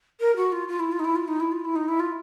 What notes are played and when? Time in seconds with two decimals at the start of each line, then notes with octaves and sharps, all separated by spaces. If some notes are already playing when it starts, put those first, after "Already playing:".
0.20 A#4
0.36 F#4
0.52 F4
0.68 F4
0.79 E4
0.92 F4
0.99 D#4
1.04 E4
1.15 F4
1.28 D#4
1.40 E4
1.52 F4
1.65 E4
1.75 D#4
1.88 E4
1.99 F4